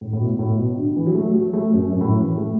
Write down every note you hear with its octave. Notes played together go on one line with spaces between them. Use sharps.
A2
A2
B2
A2
B2
D3
D3
E3
F#3
A3
F#3
A3
F#2
F#2
A2
E3
A3